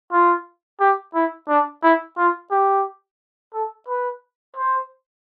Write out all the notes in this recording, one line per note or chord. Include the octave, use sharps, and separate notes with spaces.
F4
G4
E4
D4
E4
F4
G4
A4
B4
C5